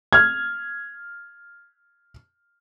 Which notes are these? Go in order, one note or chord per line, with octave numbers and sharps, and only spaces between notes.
F6 G#6